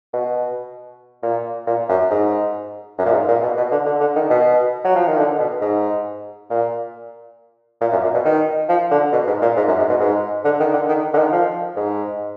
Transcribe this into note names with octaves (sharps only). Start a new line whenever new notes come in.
B2
A#2
A#2
F#2
G#2
F#2
A#2
G#2
A#2
B2
B2
D3
D3
D3
D#3
B2
F#3
F3
D#3
D3
B2
G#2
A#2
A#2
F#2
A#2
B2
D#3
F3
D3
B2
G#2
A#2
G#2
F#2
G#2
B2
G#2
D3
D#3
D3
D#3
D3
D#3
F3
G#2